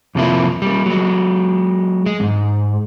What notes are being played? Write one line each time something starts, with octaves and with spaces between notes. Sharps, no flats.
F2 C3 F3 A#3 E4
G3 A#3
F#3 G#3
G#3
E2 G#2